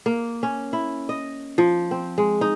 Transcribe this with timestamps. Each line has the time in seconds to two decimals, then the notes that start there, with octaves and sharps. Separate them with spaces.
0.06 A#3
0.43 C#4
0.73 E4
1.09 D#5
1.58 F3
1.91 C4
2.18 G#3
2.41 D#4